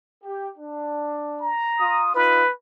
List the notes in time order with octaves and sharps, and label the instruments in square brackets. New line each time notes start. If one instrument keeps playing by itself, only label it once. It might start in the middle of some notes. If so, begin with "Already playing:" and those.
[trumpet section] G4
D4
[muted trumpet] A#5
[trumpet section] F4 D#6
[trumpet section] D#4 F4 [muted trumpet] B4